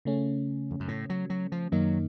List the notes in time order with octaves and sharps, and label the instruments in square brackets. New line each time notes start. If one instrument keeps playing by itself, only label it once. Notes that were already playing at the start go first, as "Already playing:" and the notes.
[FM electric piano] C#3 A3 C#4
[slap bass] F2
F#2
A2
F#3
F#3
F3
[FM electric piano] F#2 D#3 A#3 D#4 [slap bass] F#3